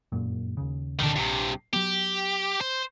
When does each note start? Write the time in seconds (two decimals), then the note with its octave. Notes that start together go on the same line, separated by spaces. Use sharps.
0.12 G1 F#2 A#2
0.57 D#2 C#3
1.00 C#2 A#2 D3 D#3 D4
1.16 A#1 G2 C3
1.73 F#3 B3 G4
2.61 C5